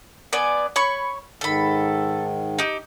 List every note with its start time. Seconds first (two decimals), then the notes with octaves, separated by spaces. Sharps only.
0.33 B3 D5 G#5
0.76 C#5 B5 C#6
1.41 G#2 D#3 A4 B5
2.59 D#4 G4